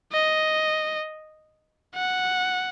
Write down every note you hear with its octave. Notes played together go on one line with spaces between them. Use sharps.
D#5
F#5